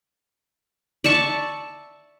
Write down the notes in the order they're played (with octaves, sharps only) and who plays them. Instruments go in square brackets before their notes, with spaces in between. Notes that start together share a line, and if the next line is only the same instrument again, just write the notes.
[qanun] D5 E5 A5 C#6